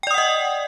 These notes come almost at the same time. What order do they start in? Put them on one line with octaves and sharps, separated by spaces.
G5 D5 D#6 F#5 D#5